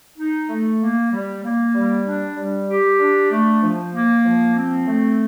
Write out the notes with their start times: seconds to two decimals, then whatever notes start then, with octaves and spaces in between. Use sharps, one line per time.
0.18 D#4
0.49 A3
0.80 A#3
1.12 G3
1.43 A#3
1.75 G3
2.05 D4
2.37 G3
2.68 G4
3.00 D4
3.31 A3
3.62 F3
3.93 A#3
4.25 F3
4.55 C4
4.87 A3